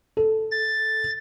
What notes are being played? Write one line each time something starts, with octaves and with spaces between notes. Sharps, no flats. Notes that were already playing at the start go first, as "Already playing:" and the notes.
A4
A6